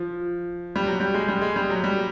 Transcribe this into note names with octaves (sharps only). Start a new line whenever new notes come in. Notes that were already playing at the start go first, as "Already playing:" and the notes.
Already playing: F3
G3
F#3
G3
G#3
G3
G#3
G3
F#3
G3